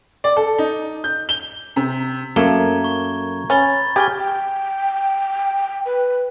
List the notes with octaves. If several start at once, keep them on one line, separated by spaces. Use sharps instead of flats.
D5
A4
D#4
G6
G7
C3
F#2 A3 A#3 A#5 G#6 G7
C#6
C#4 B5 A6 G7
G4 G#4 G5 C#6 F6 G#6
G5
B4